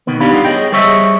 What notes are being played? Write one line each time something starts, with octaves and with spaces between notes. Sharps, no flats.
B2 D#3 B3
D4 D#4 G4 D5 F5 B5
G3 B3 F4
G#4 C#5 D#5 G5
G3 G#4 C5 C#5 D#5 E5